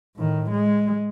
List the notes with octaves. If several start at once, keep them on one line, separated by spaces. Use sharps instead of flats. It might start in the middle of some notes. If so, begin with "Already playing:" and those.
A2 D#3
G#3